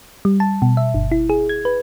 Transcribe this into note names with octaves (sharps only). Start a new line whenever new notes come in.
G3
A5
B2
E5
G1
E4
G#4
G#6
B4